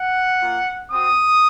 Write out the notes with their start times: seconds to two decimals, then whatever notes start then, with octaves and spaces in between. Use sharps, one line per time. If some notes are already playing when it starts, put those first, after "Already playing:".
Already playing: F#5
0.39 A#3 F4
0.90 C4 F#4 D#6